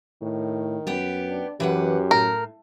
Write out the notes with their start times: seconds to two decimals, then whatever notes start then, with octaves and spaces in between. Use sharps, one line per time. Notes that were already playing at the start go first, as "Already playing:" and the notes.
0.22 A2 D#3
0.87 F#2 B3 G4
1.29 D4
1.60 F#2 E3 G4 B4 F#5
2.11 A2 A#4